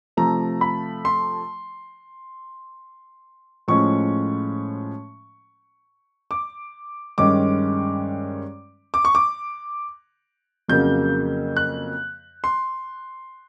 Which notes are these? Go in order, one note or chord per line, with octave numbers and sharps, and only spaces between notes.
C3 F3 A3 A#5
B5
C6
A2 F3 G#3 C#4 C#6
D6
G2 D#3 G#3 C#4 D6
D6
C#6
D6
F2 C#3 F#3 A#3 G6
F#6
C6